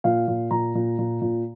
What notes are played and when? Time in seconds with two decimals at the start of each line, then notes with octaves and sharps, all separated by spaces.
0.04 A#2 F5
0.28 A#2
0.51 A#2 A#5
0.75 A#2
0.98 A#2
1.21 A#2